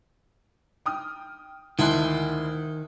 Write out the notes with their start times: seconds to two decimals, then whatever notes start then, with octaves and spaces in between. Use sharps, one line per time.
0.86 G5 D#6 F6
1.79 D2 D#3 E4 A5 C6 F#6